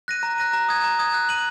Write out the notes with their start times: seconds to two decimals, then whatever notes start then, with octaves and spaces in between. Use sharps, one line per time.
0.08 F#6 A#6 D#7
0.23 A#5
0.38 F#6 A#6 D#7
0.53 A#5
0.69 D#6 G#6
0.84 A#5
0.99 D#6 G#6
1.14 F#6
1.29 D#7 F#7